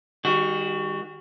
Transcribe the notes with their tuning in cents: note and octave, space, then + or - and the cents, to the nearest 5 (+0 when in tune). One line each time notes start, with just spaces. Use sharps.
D#3 +0 G3 +40 F#4 +10